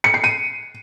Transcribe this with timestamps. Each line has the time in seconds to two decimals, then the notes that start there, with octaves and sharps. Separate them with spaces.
0.04 C#7
0.14 C7
0.24 D#7